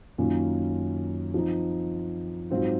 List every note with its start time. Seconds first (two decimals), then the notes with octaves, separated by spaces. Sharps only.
0.18 F#2 D#3 A#3 C#4 F4
1.34 F3 C4 D#4
2.50 G#2 F#3 C4 F4